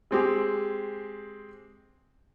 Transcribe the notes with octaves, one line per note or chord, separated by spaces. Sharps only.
G#3 C4 G4 G#4